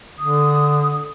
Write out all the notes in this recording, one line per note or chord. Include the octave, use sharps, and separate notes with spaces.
D3 D#6